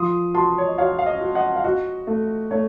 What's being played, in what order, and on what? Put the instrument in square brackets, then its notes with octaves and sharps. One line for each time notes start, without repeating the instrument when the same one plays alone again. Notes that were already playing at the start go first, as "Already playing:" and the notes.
Already playing: [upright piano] F3 [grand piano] C6 D#6
[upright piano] F#4 [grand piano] A5 C6
[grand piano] C#5
D#5
[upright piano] F#4 [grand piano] C#5 F5
[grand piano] F5
D#5
[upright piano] F#4
[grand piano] D#5 F#5
F5
[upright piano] F#4 [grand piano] D#5
[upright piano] A3
[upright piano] A3 [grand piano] C#5